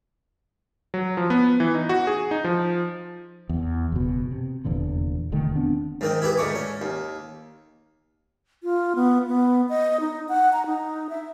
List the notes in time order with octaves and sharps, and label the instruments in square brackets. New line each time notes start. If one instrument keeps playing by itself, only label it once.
[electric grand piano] F#3
F3
B3
E3
D#4
F#4
G#4
D#4
F3
[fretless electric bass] E2
F#1 B2
C3
F1 E2 A#2 D3
E1 D3 D#3 A3
B3 C4 D4
[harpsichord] G#2 D#3 C4
E4 G4 G#4 B4
D2 G#2 D4 C#6 D6
C#4
D#2
[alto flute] F4
B3
B3
D#5
D#4
F#5
A#5
D#4
E5